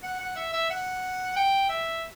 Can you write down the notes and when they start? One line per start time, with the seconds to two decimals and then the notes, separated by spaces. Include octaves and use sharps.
0.03 F#5
0.20 F#5
0.36 E5
0.53 E5
0.70 F#5
1.36 G5
1.69 E5